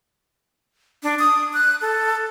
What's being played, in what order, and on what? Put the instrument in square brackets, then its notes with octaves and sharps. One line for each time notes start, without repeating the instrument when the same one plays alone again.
[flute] D4
D#6
F#6
A4